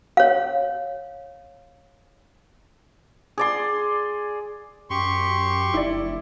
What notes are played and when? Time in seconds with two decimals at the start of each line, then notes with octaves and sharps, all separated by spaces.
0.17 C#5 F5
3.38 G#4 D5 C6
4.90 F#2 G4 C6 C#6
5.74 F1 E4 D5